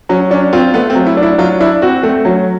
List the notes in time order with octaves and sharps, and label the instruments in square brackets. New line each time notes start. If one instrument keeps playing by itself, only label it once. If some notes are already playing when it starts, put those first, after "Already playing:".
[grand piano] F#3 [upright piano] C#4
[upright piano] C#4 [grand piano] D4
[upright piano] C4 [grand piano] F4
[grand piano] A3 [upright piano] B3
[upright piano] C4
[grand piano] F#3
[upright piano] E4
[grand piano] D4
[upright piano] E4
[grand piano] F#3 [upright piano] F4
[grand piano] D4 [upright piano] E4
[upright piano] C4 [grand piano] F#4
[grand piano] A3 [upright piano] C4
[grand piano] F#3 [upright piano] C#4